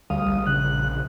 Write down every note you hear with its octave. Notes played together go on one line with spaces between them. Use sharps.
D2 G3 F5 D#6
A#1
C#3 F#6